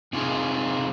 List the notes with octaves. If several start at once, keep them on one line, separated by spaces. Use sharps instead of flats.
C3 C4 D#4 F4 G#4 G#5